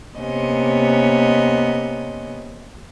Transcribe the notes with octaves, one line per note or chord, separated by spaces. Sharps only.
C3 A#3 B3 C#4 D#5